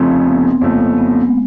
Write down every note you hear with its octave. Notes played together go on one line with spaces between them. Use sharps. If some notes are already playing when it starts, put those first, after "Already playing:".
Already playing: F1 F2 C#3 F3 A3 C4
B3
F1 F2 C#3 F3 A3 A#3
B3
G#3